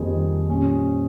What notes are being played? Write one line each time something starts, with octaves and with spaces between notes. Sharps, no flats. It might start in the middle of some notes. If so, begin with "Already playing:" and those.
Already playing: F2 D#3 G3 A#3 G#4
A#2 G3 C#4